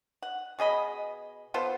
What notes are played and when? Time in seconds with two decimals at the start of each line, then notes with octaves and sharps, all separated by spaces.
0.23 F#5
0.59 B2 G#4 D#5 B5
1.54 B3 F4 A4 C5